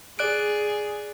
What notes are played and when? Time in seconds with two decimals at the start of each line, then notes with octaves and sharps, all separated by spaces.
0.19 G#4 D5 F#6 D7